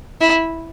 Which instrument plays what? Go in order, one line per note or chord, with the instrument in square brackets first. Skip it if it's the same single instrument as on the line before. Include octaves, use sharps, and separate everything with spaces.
[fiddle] E4